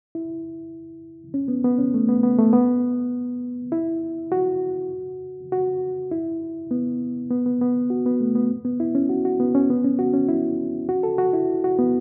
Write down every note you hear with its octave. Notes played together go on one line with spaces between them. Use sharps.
E4
C#4
B3
B3
C#4
A3
B3
B3
A3
B3
E4
F#4
F#4
E4
B3
B3
B3
B3
F#4
B3
A3
B3
B3
E4
C#4
F#4
F#4
B3
C#4
B3
C#4
F#4
C#4
E4
F#4
A4
F#4
E4
F#4
B3